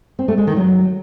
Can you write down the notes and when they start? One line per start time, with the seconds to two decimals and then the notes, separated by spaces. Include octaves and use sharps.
0.19 C4
0.28 A3
0.38 G#3
0.47 D#3
0.57 F#3